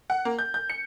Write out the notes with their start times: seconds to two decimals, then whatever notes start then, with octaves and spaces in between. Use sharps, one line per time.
0.10 F#5
0.25 A#3
0.39 G6
0.54 G6
0.70 C#7